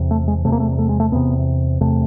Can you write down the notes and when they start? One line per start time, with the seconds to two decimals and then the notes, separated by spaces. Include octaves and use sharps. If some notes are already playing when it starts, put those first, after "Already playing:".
Already playing: E2 C3
0.11 A3
0.28 G#3
0.45 C3 A3
0.48 E2 A#3
0.60 A3
0.79 A3
0.89 G#3
1.00 A3
1.12 E2 C3 B3
1.81 E2 C3 A3